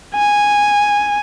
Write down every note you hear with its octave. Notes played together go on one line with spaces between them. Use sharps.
G#5